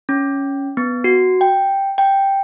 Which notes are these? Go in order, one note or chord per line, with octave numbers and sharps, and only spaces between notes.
C#4
B3
F#4
G5
G5